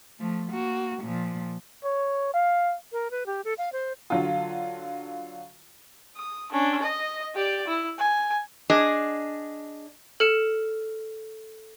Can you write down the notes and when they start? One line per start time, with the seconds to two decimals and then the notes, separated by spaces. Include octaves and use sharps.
0.19 F3 A3
0.51 A#3 F#4
1.03 A#2 F3
1.84 C#5
2.34 F5
2.92 A#4
3.11 B4
3.26 G4
3.45 A4
3.58 F5
3.72 C5
4.10 D3 F#3 F4
6.16 D#6
6.52 C#4 D4
6.82 D#5
7.35 G4 D5
7.67 E4
7.98 G#5
8.70 D4 G#4 D#5
10.20 A4 F6 C#7 E7